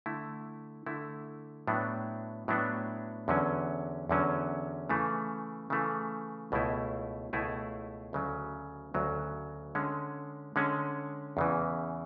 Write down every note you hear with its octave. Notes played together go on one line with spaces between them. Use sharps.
D3 A3 E4
D3 A3 E4
A2 F#3 B3 D4
A2 F#3 B3 D4
E2 D3 F#3 C#4
E2 D3 F#3 C#4
C#3 E3 A3
C#3 E3 A3
C#2 B2 A3 E4 G#4
C#2 B2 A3 E4 G#4
D2 C#3 F#3
D2 C#3 F#3
D3 G#3 C#4
D3 G#3 C#4
E2 C#3 E3